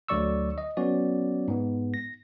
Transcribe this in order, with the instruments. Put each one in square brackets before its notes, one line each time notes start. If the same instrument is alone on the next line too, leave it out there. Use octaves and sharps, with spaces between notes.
[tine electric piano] D2 D3 F#3 D5 C#6 E6
D#5
F#3 B3 C#4 F#4 D5
G#2 B3
A#6